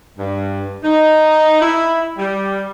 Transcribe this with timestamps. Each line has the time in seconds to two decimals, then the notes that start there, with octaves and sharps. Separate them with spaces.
0.17 G2
0.82 D#4
1.59 E4
2.17 G3